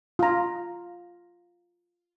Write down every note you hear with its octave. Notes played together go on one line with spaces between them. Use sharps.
F4 A#5